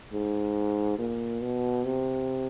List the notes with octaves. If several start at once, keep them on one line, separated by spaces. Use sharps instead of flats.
G#2
A#2
B2
C3